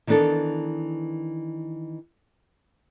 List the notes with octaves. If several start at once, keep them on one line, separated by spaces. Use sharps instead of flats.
D#3 E3 B3 D4 A4